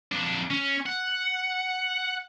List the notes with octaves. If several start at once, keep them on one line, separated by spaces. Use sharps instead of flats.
F2 D4
C#4
F#5